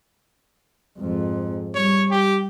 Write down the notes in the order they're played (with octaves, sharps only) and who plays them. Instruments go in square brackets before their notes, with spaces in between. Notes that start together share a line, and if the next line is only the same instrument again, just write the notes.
[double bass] F2 G#2
[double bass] G3 [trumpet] C#5
[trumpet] G4